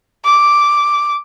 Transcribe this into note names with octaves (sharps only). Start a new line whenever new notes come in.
D6